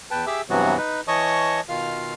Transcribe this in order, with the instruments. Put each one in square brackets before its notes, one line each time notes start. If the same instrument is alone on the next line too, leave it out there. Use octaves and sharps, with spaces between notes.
[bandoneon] E2 B4 G5 A5
G4 G#4 E5 D6 E6
G2 C3 E3 F#3 B3 F#4
D#4 B4
E3 C#5 D#5 A5 C#6 D#6
B2 D#3 F4 F5 F6